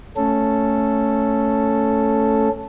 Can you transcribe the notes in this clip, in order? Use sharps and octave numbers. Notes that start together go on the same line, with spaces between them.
A3 C#4 A4